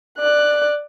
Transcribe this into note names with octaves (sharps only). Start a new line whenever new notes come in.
D5 F#6